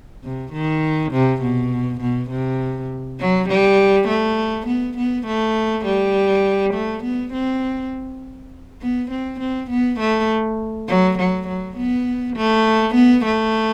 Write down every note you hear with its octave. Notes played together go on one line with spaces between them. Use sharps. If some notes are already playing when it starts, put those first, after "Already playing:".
C3
D#3
C3
B2
B2
C3
F#3
G3
A3
B3
B3
A3
G3
A3
B3
C4
B3
C4
C4
B3
A3
F#3
F#3
F#3
B3
A3
B3
A3